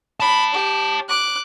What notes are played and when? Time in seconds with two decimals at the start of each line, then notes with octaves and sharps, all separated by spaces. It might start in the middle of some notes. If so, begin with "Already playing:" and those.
0.20 C#5 A5 B5
0.54 G4
1.09 D6 F#6